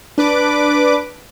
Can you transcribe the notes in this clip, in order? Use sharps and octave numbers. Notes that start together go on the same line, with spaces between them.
D4 B4 D6